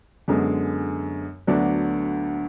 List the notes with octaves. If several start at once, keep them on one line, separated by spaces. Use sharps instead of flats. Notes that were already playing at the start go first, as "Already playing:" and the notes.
F#2 D3 G#3 B3
D2 D3 F#3 B3 D4